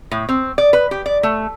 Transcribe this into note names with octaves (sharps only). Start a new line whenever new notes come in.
A2
C4
D5
B4
G4
D5
A3